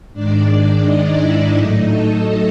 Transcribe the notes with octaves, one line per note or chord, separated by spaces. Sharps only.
G#2 D#3 G#3 D4 D5
D#4 D#5
E4 E5
A2 F#3 A3 D#4 D#5
A4 A5